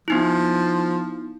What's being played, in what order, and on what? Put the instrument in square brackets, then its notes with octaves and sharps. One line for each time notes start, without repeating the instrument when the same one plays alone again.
[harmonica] F3 [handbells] B3 D#4 E4